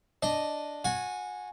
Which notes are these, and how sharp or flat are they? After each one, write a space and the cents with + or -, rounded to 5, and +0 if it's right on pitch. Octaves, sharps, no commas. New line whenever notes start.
D4 +0 D#5 -5
F#4 -20 G#5 +0